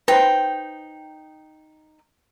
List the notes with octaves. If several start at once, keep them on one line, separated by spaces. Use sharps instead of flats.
D#4 B4 C5 G5